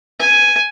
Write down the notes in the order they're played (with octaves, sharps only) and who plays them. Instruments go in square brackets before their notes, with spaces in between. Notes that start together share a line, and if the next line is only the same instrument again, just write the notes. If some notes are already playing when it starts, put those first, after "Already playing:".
[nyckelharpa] G#5